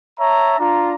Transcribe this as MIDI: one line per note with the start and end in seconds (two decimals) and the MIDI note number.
0.19 0.57 73
0.19 0.57 76
0.19 0.57 81
0.19 0.57 82
0.59 0.95 62
0.59 0.95 65
0.59 0.95 82